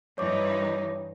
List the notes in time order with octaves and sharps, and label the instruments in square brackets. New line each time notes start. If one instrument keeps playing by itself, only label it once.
[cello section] G2 E3 D#4 [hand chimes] C#5 D6